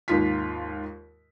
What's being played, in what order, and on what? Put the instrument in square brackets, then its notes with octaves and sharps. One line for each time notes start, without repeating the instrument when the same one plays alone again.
[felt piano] D#2 G#2 F4 B6